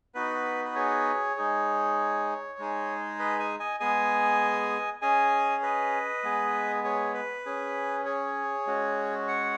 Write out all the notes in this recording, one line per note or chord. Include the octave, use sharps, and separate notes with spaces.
B3 D#4 F#4 B4
B4
G#4 C#5
G#3 D#4 G#4
G#3 D#4 G#4
B4 D#5
D#5 G#5
D#5 G#5
G#3 B3 G#4 D#5 G#5
C#4 G#4 D#5 G#5
B4 D#5
G#3 B3 G#4
G#4 C#5
B4
C#4 G#4
G#4 C#5
G#3 C#4 F#4
C#5 F#5